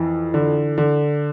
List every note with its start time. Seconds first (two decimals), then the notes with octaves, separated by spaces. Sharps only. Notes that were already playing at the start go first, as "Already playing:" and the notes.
Already playing: F2 E3
0.34 D3
0.78 D3